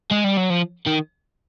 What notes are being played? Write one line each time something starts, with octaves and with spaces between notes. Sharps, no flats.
G#3
G3
F#3
F3
D#3